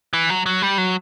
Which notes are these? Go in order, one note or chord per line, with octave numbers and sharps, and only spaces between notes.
E3
F#3
F#3
G3
F#3